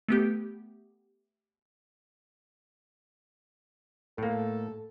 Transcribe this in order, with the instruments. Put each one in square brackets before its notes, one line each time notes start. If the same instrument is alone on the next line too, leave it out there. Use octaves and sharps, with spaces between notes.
[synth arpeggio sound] A3 B3 G4
[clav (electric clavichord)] A2 A#3 [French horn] A4